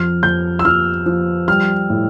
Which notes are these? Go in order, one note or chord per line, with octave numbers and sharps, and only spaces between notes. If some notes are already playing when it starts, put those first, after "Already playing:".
Already playing: F2 F6
F2 G6
E6
F3 F6
F3
G3 F6
A2